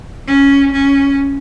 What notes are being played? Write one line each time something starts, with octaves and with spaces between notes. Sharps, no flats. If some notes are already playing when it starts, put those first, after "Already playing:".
C#4
C#4